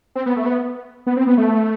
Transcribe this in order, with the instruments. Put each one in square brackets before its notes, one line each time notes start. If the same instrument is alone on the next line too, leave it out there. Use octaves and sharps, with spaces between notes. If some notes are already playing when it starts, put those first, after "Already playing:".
[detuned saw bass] C4
B3
A3
B3
B3
C4
B3
A3